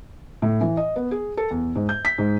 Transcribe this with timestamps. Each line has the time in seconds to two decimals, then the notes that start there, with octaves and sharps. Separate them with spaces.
0.42 A2
0.61 E3
0.77 D#5
0.96 B3
1.11 G#4
1.37 A4
1.51 E2
1.75 G#2
1.89 G6
2.05 B6
2.18 G#2